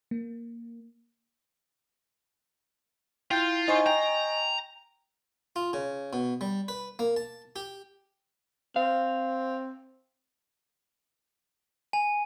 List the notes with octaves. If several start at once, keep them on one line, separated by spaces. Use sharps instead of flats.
A#3
E4 F4 G5 G6
D#4 C5 D#5 G#5 C#6 C7
G5 A#5
F4
C#3
B2
G3
B4
A#3
A5
G4
C4 F5
G#5